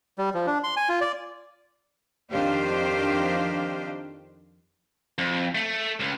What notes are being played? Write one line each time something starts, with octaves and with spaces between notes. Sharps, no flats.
G3
F3
D4
C6
G#5
F4
D5
F2 D#3 D4 G4 C5 F5
F2
A3
C#2